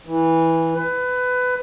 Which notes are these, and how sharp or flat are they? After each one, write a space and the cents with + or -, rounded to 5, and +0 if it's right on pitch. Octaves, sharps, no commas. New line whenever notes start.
E3 -10
B4 +20